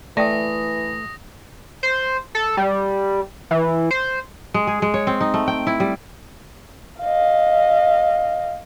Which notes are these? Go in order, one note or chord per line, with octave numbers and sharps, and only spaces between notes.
E3 A3 D5 G5 D#6 A#6
C5
A4
G3
E3
C5
G#3
G#4
G#3
C#5
C4
D#4
A3
G5
E4
G3
D#5 F5